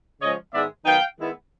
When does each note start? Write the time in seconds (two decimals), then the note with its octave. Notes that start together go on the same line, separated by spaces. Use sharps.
0.21 C#3 F3 G#3 C#5 D#5
0.53 G#2 D#3 G#3 B3 E4 D5 E5
0.85 D#3 F#3 B3 D#4 F5 G5
1.18 D#3 G#3 B3 E4